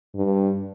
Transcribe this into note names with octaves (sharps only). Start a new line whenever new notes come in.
G2